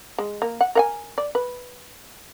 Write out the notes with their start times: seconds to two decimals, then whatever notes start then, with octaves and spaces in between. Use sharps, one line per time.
0.18 G#3
0.42 A#3
0.61 F#5
0.75 A#4 F#5 G#5
1.18 D5
1.35 B4